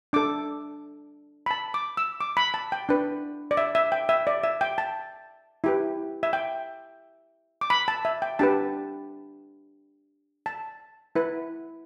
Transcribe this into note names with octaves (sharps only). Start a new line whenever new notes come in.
D4 A4 D6
B5
A5
D6
E6
D6
B5
A5
G5
D4 B4
D5
E5
E5
G5
E5
D5
E5
G5
A5
E4 G4 B4
E5
G5
D6
B5
A5
E5
G5
D4 G4 B4 A5
A5
E4 B4